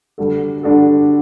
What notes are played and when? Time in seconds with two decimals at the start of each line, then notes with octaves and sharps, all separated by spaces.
0.18 D3 G3 D4 F#4 A4
0.63 D3 G3 D4 F#4 A4